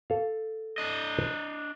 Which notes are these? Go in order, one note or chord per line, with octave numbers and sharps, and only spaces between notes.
A4 F5
D4 D#5